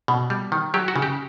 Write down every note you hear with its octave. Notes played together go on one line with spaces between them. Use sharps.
B2
G3
D#3
F#3 G4
F#4
C#3
G4